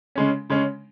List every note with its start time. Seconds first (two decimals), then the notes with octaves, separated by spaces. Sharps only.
0.15 C#3 G#3 C#4
0.50 C#3 G#3 C#4